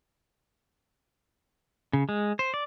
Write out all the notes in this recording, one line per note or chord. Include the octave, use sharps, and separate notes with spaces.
C#3
G#3
C5
D5